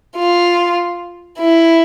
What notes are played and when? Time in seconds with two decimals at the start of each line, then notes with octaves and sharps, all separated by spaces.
0.15 F4
1.39 E4